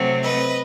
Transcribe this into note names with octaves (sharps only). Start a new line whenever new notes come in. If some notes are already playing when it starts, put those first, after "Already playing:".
Already playing: C3 F#3 A3 C4
B4 D#5